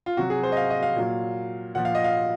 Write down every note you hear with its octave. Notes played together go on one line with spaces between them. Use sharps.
F4
C3 F#3 F#4
G#4
C5
D#5
F5
D#5
F5
A#2 F#3
A#2 F3 F#5
F5
D#5
F5